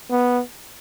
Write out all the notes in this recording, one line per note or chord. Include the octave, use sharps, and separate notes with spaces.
B3